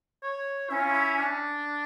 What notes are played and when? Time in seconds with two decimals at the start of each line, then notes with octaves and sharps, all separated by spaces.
0.23 C#5
0.70 C#4 E4
0.79 F4
0.89 E4
1.17 D4